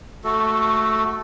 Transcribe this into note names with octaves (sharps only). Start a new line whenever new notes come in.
A3 F#4 A4